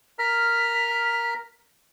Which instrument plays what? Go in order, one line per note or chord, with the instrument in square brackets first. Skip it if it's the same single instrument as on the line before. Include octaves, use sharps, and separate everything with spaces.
[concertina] A#4 A#5 F6 [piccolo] B6